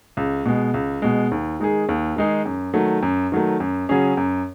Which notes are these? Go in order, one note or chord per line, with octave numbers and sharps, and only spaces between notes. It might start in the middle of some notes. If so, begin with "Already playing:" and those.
C#2
B2 G#3
C#2
B2 G#3
D#2
D#3 G#3 D#4 G#4
D#2
D#3 G#3 D#4 G#4
F#2
D#3 F#3 A3
F#2
D#3 F#3 A3
F#2
C#3 F#3 C#4 G#4
F#2